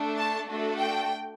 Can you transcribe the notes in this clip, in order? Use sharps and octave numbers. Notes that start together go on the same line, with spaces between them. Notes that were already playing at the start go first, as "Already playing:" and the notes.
Already playing: A3 D4 A4
A5
A3 D4 F#4 A4
G5